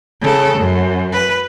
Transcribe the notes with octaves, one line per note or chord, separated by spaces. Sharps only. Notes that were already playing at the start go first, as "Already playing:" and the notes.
C#3 A4
F#2
B4